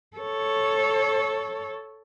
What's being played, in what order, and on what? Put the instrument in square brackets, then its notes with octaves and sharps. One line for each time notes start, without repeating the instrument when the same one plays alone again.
[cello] A4 C#5